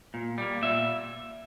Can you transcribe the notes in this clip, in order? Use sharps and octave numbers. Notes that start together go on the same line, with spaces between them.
A#2
G3 A#3
A#2 E5